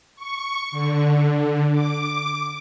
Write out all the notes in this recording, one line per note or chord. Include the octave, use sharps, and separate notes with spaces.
C#6
D3
D6